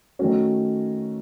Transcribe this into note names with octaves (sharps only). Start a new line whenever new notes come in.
D#3 A3 C#4 F#4